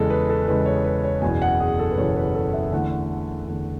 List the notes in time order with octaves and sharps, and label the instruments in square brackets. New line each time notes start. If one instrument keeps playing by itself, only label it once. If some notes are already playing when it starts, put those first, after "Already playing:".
Already playing: [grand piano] E2 C#3 G#3 G#4 A4
B4
A4
E2 C#3 G#3 B4
C#5
B4
C#5
F#1 E2 B2 G#5
F#5
G#4
A4
B4
F#1 E2 B2 C#5
B4
A4
E5
E2 D3 A3 F#5
E2 D3 A3